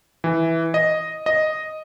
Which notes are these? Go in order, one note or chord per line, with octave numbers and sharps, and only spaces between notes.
E3
D#5
D#5